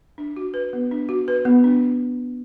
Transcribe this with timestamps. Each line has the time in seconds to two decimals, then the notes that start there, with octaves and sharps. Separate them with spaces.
0.18 D4
0.36 F#4
0.54 B4
0.73 B3
0.91 D4
1.09 F#4
1.28 B4
1.45 B3
1.64 D4